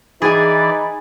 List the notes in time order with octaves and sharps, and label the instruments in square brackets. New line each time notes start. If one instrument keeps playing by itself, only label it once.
[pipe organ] E3 D5 [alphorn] D#4 [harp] G#4 G#5 [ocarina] B5